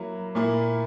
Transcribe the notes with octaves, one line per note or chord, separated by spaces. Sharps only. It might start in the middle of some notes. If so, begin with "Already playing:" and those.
Already playing: F#3 A#3 E4
A#2 A#3 E4